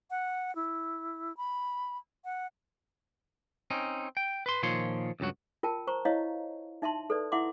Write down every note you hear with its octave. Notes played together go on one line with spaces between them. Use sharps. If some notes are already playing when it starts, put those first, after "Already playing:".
F#5
E4
B5
F#5
C4 C#4 D#4
G5
B4 C6
A#2 D#3 F3 C#5 C6
C#2 G2 F#3 F#4
F4 A#4 G5 A5
C5 A#5 C#6
E4 C#5 D#5 F5
D#4 E5 A5 C6
A4 B4 D5
E4 E5 F#5 C6 D6